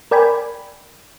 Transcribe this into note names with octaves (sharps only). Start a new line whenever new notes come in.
A#4 D5 G5 G#5 B5